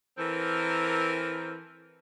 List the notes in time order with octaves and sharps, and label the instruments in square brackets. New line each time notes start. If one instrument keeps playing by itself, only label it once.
[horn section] E3 C4 A4 A#4